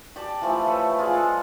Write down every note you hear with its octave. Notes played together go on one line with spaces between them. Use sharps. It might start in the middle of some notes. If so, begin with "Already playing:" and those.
G4 D5 G5 A5
E3 F3 A3
A4 B4 C#5
F4 G#4 D5
G#3 A4